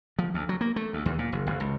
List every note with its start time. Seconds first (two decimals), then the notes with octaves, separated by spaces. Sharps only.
0.19 F3
0.34 D2
0.49 F#3
0.61 A#3
0.76 A3
0.93 D2
1.06 D#2
1.19 A#2
1.32 F#1
1.47 F#1
1.60 C#2